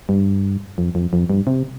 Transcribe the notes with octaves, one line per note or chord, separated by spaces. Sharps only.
G2
F2
F2
F2
G2
C3